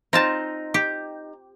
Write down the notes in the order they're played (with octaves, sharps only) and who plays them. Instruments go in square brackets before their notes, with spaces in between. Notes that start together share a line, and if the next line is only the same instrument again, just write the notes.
[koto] C4 F4 A5 [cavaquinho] D#4 A#5 C6
[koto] G4